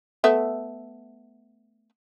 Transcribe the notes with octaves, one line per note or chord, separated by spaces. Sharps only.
A3 B3 E5